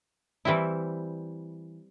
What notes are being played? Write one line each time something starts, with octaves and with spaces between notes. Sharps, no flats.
E3 G3 C4 E4